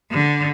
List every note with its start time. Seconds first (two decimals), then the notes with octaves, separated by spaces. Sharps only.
0.11 D3